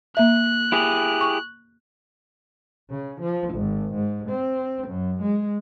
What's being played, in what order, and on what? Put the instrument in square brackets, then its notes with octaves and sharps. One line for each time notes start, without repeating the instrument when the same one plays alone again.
[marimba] A#3 E5 [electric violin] F#6
[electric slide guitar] E4 G4 G#4
[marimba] C#6
[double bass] C#3
F3
G#1
G#2
C4
F#2
G#3